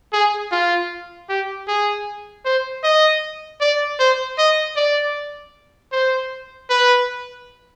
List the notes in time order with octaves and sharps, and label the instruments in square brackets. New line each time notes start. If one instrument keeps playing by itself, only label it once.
[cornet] G#4
F4
G4
G#4
C5
D#5
D5
C5
D#5
D5
C5
B4